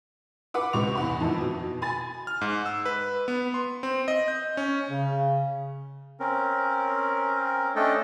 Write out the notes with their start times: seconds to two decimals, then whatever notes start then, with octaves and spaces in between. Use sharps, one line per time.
0.54 B4 F#5 D6
0.73 C#2 C3 C#6 F7
0.95 E2 F#5 B5
1.20 F2 D#3 E4
1.41 B2
1.82 G#5 B5 A6
2.27 F6
2.41 G#2
2.66 E6
2.86 B4
3.28 B3
3.54 C6
3.83 C4
4.08 D#5
4.28 G6
4.57 C#4
4.90 C#3
6.20 C4 C#4 A#4
7.76 A3 C#4 D4 A4 D#5 G5